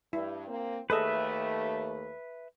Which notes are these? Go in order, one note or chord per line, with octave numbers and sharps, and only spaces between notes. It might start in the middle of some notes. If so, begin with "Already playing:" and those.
G2 E4
A#3 C4
D#2 A3 G#4 A4 B4 D#5 E5